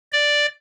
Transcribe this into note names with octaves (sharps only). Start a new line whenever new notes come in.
D5